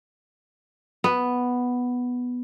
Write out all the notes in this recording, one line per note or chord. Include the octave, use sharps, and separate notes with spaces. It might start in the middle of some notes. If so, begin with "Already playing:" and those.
B3